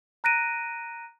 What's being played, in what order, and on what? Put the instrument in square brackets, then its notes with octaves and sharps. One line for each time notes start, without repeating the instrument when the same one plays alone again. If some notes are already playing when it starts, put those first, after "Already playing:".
[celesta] A#5 F#6 A#6 D7 D#7